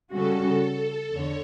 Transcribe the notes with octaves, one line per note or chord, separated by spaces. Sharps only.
C#3 G3 C#4 F#4 A4
E2 D3 C#5